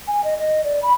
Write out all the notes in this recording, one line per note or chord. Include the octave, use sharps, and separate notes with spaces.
G#5
D#5
D#5
D5
B5